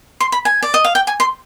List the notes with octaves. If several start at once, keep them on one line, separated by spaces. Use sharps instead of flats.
C6
B5
G#5
D5
D#5
F5
G5
G#5
C6